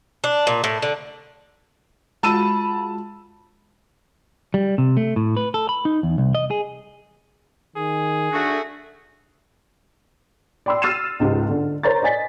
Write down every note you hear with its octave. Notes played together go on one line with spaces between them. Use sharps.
D4
A#2
A2
D3
G#3 F4 F#4 A5 B5 E6 D#7
G3
C3
A3
A2
B4
A4
B5
D#4
E2
C2
D#5
G#4
D#3 G#4
A3 D4 F#4
D5 G5 B5 C6 E6
E6 F6 A6 C7 D#7 E7
C#2 G#2 C#3 G4
D3
A#4 C5 C#5 A#5 A6
D5 D#5 G#5 A6 B6